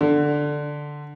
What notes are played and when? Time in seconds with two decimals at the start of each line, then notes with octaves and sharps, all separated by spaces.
0.01 D3